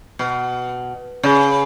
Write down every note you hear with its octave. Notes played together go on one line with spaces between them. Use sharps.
B2
C#3